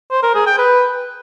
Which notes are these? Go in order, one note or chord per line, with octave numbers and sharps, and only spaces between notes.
C5
A#4
G#4
G5
B4